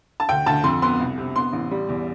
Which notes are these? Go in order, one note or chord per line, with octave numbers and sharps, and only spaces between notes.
A5
D2 G5
D2 A5
F2 C6
B3 C6
C2
C3
B3 C6
A1
G3
E2